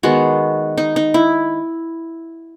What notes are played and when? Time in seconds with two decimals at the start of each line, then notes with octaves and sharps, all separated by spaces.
0.03 D#3 G#3 B3 F#4
0.78 D#4
0.96 D#4
1.14 E4